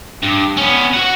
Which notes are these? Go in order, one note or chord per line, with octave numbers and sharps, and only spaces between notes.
G2
B3 C#4
F#4 F#5